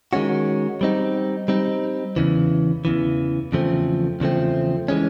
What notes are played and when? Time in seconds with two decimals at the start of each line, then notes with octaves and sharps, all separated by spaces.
0.13 D#3 G#3 C#4 F#4
0.81 G3 C4 D#4
1.48 G3 C4 D#4
2.16 E2 C#3 E3
2.85 E2 C#3 E3
3.52 E2 C#3 F3 A3 C4
4.20 E2 C#3 F3 A3 C4
4.88 E3 G#3 C#4